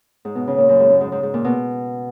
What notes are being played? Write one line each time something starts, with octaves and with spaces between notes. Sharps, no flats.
G#2
B2
C#3
A#2
F#2
G#2
F#2
G#2
G#2
G#2
A#2
B2